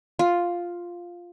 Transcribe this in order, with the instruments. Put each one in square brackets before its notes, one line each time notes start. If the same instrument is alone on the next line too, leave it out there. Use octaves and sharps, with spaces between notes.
[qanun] F4